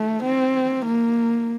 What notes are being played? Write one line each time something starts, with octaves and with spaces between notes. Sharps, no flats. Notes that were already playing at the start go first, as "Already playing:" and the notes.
Already playing: A3
C4
A#3